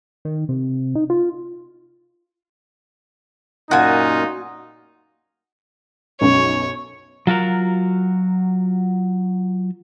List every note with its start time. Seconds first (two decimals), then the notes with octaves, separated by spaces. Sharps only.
0.25 D#3
0.49 C3
0.95 D#4
1.10 F4
3.71 F#2 A#2 D#4 F4 F#4 G#5
6.21 B1 F#2 C#5
7.27 F#3 F4 F#4 A#4